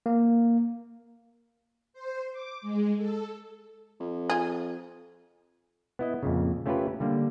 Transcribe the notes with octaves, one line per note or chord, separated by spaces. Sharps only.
A#3
C5
D6
G#3
A4
F2
F4 G#4
B3 E4 D#5
F2 A#2 C#3
A3 C#4 F4 G4 A#4 B4
D3 G3 A#3